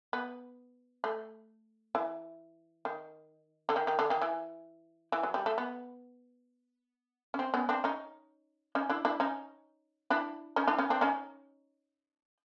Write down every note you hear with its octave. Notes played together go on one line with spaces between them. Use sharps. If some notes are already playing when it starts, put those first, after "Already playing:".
B3
A3
E3
D#3
D3
D#3
D#3
D3
D#3
E3
E3
F#3
G3
A3
B3
C#4
C4
B3 C#4
C4 D4
C#4 D#4
C#4 D#4
D4 E4
D4 E4
C#4 D#4
D4 E4
C#4 D#4
D4 E4
C#4 D#4
C4 D4
C#4 D#4